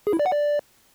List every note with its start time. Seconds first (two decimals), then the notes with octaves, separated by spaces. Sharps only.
0.07 G#4
0.13 E4
0.19 D5
0.26 F#5
0.32 D5